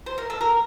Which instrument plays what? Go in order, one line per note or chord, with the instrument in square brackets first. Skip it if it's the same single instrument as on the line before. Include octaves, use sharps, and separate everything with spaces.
[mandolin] C5
A#4
A4
A#4